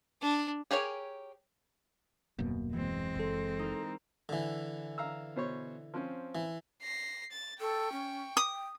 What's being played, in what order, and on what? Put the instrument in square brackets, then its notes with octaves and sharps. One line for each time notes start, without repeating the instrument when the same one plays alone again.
[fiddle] D4
[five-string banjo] G4 G#4 A#4 C#5 G#5
[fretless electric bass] D#1 F#2 B2 [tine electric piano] A#3
[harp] E3 [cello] G#3 C4
[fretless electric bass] F#1 [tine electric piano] A4 C6
[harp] D#4 E4 A#4
[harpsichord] D3 E3
[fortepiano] F5 A#5 E6
B2 C5 C#5
F3 C4 C#4
[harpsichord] E3
[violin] A#6 C7
A6
[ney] A4 [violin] G5 C#6
[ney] C#4
[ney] G5 [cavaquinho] D#6